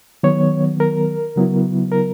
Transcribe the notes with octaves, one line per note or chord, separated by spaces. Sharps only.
D#3 F#3 B3 C#5
A#4
C#3 F#3 B3 E4
A#4